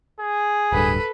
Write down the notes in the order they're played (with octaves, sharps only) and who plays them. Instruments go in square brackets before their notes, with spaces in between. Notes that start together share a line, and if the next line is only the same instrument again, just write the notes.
[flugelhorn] G#4
[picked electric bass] D1 G2 [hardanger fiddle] A4 B4